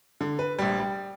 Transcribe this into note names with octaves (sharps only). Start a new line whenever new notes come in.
D3
B4
A#1 G3
G3